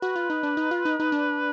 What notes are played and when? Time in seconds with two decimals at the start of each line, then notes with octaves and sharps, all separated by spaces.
0.02 F#4 B4
0.16 F4
0.30 D#4
0.43 D4
0.57 D#4
0.71 F4
0.85 D#4
1.00 D#4
1.12 D4